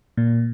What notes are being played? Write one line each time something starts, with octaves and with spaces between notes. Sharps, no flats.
A#2